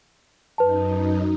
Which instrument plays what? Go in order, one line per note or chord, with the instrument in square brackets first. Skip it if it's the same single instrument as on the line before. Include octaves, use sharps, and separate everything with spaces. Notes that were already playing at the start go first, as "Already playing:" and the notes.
[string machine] F#2 D#4 [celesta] B4 A5